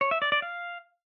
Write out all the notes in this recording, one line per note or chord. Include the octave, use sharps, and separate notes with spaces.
C#5
E5
D5
D5
F5